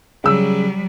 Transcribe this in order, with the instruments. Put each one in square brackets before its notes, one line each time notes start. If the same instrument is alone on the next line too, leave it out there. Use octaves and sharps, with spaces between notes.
[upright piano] C#3 E6 [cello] F#3 G3